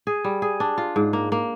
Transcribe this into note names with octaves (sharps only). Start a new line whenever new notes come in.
G#4
G3
G#4
D4
F4
G#2
A#3
A#3